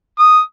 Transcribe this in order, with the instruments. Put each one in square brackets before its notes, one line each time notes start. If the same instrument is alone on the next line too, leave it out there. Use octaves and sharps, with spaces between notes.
[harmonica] D#6